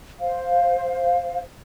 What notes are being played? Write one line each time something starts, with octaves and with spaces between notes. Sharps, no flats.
C5 F5